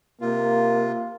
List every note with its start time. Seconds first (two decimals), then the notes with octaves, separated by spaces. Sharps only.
0.21 C3 A#3 F4